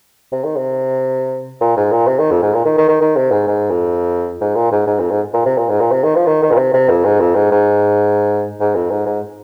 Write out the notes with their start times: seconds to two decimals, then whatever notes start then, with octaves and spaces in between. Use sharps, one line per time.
0.32 C3
0.44 D#3
0.56 C3
1.61 A#2
1.77 G#2
1.91 A#2
2.07 C3
2.19 D#3
2.31 F2
2.42 G#2
2.54 A#2
2.65 D#3
2.77 D#3
2.89 D#3
3.01 D#3
3.16 C3
3.31 G#2
3.48 G#2
3.70 F2
4.41 G#2
4.55 A#2
4.72 G#2
4.87 G#2
4.99 F2
5.11 G#2
5.34 A#2
5.46 C3
5.58 A#2
5.69 G#2
5.80 A#2
5.92 C3
6.04 D#3
6.16 F3
6.26 D#3
6.42 D#3
6.52 A#2
6.58 C3
6.73 C3
6.89 F2
7.05 G#2
7.20 F2
7.35 G#2
7.51 G#2
8.60 G#2
8.75 F2
8.91 G#2
9.06 G#2